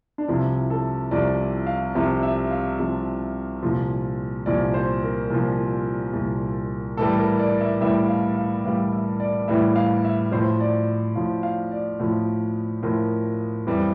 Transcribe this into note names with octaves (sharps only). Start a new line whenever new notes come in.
D4
C2 C3 F3 E4
A4
C2 C3 F3 D5
F5
C2 C3 F3 E5
E5
F5
C2 C3 F3
C2 A#2 F3
C2 A#2 F3 D5
C5
A#4
C2 A#2 F3
C2 A#2 F3
A2 E3 G3 A4
A#4
D5
E5
A2 E3 G3 E5
F5
F5
A2 E3 G3 F5
E5
D5
A2 E3 G3 E5
F5
E5
A2 F3 C5
D5
A2 F3 F5
F5
D5
A2 F3
A2 F3 A#4
F2 E3 G3